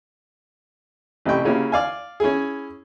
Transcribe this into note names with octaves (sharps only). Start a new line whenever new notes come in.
A1 C3 E4 G5 C#6
C#3 A#3 C#4 E4 F#4 G4
D5 F5 G#5
C#4 E4 G#4